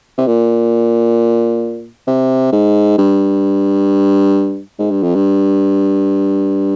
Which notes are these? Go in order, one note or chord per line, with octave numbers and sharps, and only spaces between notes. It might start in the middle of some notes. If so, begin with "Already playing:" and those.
C3
A#2
C3
G#2
G2
G#2
G2
F2
G2